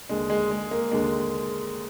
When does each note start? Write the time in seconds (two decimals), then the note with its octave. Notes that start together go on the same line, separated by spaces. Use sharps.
0.09 D#2 D3 G#3
0.30 G#3
0.51 G#3
0.71 A#3
0.91 D#2 D3 G#3